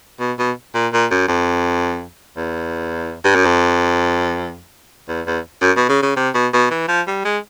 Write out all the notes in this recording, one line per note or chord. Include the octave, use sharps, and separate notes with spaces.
B2
B2
A#2
A#2
F#2
F2
E2
G2
F#2
F2
E2
E2
F#2
B2
C#3
C#3
C3
B2
B2
E3
F3
G3
G#3